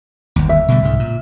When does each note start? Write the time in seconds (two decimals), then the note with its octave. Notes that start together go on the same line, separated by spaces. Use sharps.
0.36 G1 D#2
0.49 E5
0.68 B2 D3 G3
0.82 C2 G#2 C#3
0.99 A#2